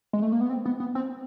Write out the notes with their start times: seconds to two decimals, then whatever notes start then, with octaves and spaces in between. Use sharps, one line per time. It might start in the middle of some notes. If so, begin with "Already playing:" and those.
0.13 G#3
0.22 A3
0.32 A#3
0.41 B3
0.50 C4
0.65 B3
0.80 B3
0.95 C4